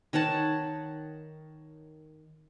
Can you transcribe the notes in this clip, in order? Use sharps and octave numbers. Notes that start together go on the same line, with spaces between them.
D#3 C#5 F#5 A5